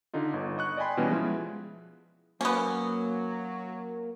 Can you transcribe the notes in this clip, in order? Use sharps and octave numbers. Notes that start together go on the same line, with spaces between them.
D3 D4 D#4 F4
G1
D#5 C#6 F#6
D5 D#5 G5 G#5 B5 C6
B2 E3 G3 B3 C#4
F3 G#3 E4
F#3 A#3 B3 C#4